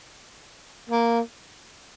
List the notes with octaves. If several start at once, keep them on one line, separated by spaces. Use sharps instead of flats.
A#3